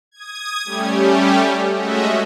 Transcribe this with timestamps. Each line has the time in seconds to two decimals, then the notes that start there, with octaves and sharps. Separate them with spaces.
0.11 D#6 G#6
0.64 G3 A3 C#4 G4
1.73 G#3 A3 C#4 F#4 D#5 E5